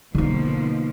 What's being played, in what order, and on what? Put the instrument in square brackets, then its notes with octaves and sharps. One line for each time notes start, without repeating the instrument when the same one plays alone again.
[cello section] B2 F3 A#3 [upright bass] D3 D#4